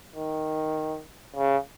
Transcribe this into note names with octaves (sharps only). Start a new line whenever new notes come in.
D#3
C#3